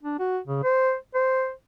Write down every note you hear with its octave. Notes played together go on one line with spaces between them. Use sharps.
D4
F#4
C#3
C5
C5